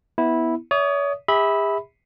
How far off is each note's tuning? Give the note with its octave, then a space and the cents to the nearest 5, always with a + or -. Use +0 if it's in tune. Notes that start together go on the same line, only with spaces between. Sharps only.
B3 +0 E4 -10
C#5 +40 E5 -15 D#6 -15
G#4 -45 E5 -25 B5 +0